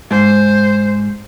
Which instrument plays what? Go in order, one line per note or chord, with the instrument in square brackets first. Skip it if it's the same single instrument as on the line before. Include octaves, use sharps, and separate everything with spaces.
[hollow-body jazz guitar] G#2 [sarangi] C5